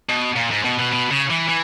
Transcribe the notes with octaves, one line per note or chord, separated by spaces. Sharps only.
B2
A#2
G#2
B2
B2
B2
C#3
E3
E3